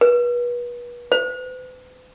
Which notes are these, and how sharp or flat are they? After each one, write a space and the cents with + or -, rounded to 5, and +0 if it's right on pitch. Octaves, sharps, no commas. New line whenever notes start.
B4 -35
B4 +45